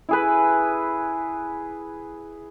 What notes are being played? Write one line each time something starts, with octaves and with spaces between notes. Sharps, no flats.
E4 G#4 B4